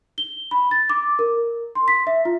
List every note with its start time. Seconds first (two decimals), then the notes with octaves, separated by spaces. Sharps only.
0.18 G7
0.51 B5
0.71 A6
0.90 D6
1.19 A#4
1.75 C6
1.88 B6
2.07 E5
2.25 F4